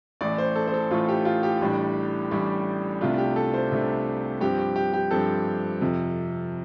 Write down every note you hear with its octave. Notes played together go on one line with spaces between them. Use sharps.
A1 A2 A3 D5
C5
A4
C5
A4
A1 A2 A3 F4
G4
F4
G4
A1 A2 G3 D4
A1 A2 G3 D4
C2 C3 A3 D4 F4
G4
A4
C5
C2 C3 A3 D4
G2 F3 C4 G4
G4
G4
G4
G2 F3 C4 A4
F2 C3 F3